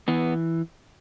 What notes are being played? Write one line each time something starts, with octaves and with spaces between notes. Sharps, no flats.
E3 B3